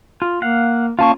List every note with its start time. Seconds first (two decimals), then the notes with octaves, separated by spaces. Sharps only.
0.22 F4
0.42 A#3 F5 F#5
0.99 A#3 C#4 F4 F5 A5 C#6